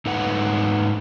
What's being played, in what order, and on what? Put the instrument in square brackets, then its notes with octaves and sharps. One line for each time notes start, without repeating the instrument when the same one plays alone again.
[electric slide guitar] G#2 D#4 A4 B4 F#5